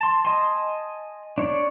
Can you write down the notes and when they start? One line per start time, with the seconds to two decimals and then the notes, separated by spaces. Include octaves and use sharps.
0.01 A5 C6
0.25 D#5 G#5 A5 C6
1.38 D4 C#5 D5